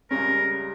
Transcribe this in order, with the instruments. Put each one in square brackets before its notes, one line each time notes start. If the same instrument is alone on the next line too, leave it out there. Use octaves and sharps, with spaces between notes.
[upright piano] C#2 C#3 G3 C#4 [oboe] A#4